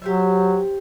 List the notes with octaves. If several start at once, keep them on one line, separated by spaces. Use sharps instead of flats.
F#3 G4 C5 E5